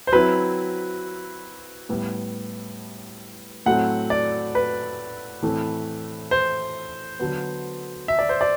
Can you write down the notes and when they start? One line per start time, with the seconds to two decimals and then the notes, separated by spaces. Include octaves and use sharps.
0.07 C5
0.12 F#3 C4 E4 B4
1.89 A2 G3 B3
3.66 A2 F#3 A3 C4 F#5
4.10 D5
4.55 B4
5.42 A2 E3 A3 C4
6.31 C5
7.19 D3 F#3 B3
8.08 E5
8.19 D5
8.29 C5
8.41 D5